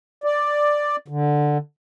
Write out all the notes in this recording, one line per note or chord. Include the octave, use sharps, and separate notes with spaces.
D5
D3